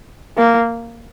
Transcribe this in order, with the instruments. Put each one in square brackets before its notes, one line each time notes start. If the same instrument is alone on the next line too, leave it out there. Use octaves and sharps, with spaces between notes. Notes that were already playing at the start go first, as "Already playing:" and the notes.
[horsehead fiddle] A#3